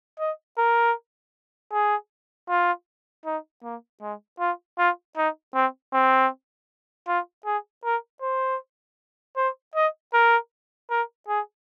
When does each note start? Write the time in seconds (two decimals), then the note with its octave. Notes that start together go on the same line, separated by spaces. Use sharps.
0.19 D#5
0.58 A#4
1.73 G#4
2.49 F4
3.26 D#4
3.64 A#3
4.02 G#3
4.40 F4
4.78 F4
5.17 D#4
5.55 C4
5.93 C4
7.08 F4
7.46 G#4
7.85 A#4
8.22 C5
9.37 C5
9.75 D#5
10.14 A#4
10.90 A#4
11.28 G#4